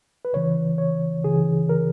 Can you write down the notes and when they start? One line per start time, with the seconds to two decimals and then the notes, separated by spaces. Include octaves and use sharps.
0.25 B4
0.33 C#2 C#3 E3 C#5
0.78 C#5
1.24 C#2 C#3 E3 G#4
1.69 A#4